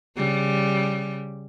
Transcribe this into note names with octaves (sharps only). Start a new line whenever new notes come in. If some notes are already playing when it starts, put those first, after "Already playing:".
C#3 G3